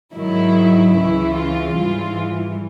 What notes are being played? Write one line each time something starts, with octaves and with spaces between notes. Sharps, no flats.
G#2 D#3 F#3 E4
C#2 C#3 E3 E4
F4
G#2 E3 G3 F4